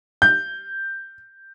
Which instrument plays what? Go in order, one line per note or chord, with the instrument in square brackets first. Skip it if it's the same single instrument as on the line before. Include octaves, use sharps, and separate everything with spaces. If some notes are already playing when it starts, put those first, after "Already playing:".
[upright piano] G6